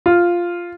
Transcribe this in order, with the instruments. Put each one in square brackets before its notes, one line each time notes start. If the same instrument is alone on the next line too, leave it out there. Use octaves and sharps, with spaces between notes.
[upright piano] F4